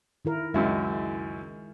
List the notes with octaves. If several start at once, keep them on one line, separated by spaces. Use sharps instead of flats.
D#3 E4 A#4
C#2 F#2 G#3 E4 E5